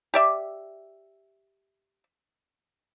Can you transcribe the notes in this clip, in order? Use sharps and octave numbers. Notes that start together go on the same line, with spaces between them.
G4 D5 E5